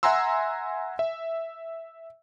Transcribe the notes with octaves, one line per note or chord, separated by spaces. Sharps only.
E5 F#5 G#5 A#5 C6 E6
E5